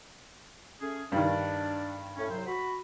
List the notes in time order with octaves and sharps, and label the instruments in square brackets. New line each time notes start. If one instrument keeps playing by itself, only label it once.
[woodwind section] A3 C#4 G#4
[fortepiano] G2 D#3 [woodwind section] D4
[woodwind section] A2 C#4
C2 F#3 C5
F#4 B5